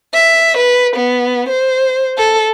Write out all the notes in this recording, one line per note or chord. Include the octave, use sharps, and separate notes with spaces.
E5
B4
B3
C5
A4